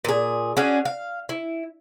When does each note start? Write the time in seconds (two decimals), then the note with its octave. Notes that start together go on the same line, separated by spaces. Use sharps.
0.05 A#2 G#4
0.57 C#4 D4 F#4 G#4
0.85 F5
1.29 E4